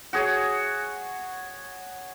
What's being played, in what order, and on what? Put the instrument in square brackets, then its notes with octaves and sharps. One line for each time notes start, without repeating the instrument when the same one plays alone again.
[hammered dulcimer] F#4 G#4 C#5